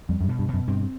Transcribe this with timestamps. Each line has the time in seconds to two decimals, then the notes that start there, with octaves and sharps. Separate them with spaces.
0.09 F2 G3
0.21 F#2
0.24 G2
0.29 B2
0.39 G2
0.48 B2
0.54 F#2
0.68 G2 C4